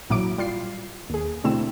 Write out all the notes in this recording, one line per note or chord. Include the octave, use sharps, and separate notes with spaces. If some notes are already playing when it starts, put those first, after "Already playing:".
A1 A#2 F#3 E4 D6 D7
G3 F4 C7
D#2 G#4
B2 D3 A3 C4 E4 E7